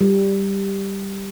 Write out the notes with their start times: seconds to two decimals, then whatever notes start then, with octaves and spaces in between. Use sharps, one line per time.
0.01 G3